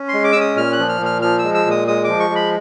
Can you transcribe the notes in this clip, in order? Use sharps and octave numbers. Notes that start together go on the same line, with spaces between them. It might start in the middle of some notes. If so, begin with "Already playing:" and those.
Already playing: C#4
C6
G#3
D6
E6
C#4
D#6
A#2 F6
F#6
F3
F6
A#2 F6
F3 F6
G#3 E6
E6
A#2 D#6
G#3 D#6
F3 D6
C#6
G#3
B5